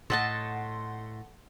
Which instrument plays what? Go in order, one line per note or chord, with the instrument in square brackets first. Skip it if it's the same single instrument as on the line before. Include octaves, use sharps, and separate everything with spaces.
[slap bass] A2 [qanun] A4 D#5 A5 [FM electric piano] F#5 C6